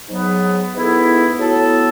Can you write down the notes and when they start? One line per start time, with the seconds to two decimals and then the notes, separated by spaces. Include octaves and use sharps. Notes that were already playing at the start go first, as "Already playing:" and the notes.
0.09 G#2 F#3 B3
0.74 G#2 E3 B3 E4 A4
1.38 A2 F#3 B3 E4 A4